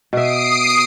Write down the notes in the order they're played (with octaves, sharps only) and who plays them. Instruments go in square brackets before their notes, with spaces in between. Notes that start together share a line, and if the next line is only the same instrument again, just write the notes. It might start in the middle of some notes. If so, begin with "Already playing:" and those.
[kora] B2 E5 [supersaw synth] D#6 C7 D7